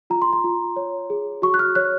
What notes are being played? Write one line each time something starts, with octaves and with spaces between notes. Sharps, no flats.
F4 A#5
C6
A#5
F4
C#5
G#4
F#4 C#6
F#6
F6
C#5 F#6